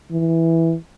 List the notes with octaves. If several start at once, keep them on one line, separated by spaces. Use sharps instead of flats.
E3